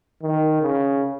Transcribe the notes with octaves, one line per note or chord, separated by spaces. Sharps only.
D#3
C#3